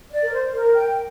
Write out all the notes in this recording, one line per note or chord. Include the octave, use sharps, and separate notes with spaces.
D5
A#4
C5
A#4
G5